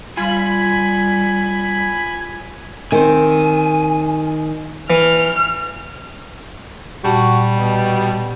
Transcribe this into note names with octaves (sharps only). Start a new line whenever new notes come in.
G3 F4 G#5 B5
D#3 C4 G#5
E3 F6
A#2 G3 F#4 A5
B2